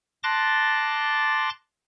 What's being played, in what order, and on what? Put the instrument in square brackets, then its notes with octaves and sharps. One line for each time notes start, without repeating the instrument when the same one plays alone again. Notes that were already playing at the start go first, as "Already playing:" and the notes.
[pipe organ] A5 C6 D6 F#6 A6 A#6